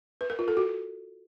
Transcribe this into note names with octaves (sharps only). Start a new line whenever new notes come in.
B4
A#4
F4
A4
F#4